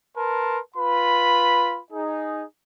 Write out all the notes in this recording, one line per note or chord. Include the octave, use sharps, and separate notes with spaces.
A#4 B4 A5 C6
F4 B4 B5
D#4 G#4